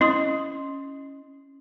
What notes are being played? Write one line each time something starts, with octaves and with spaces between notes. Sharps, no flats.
C4 C#4 E4 D#5 C6 D#6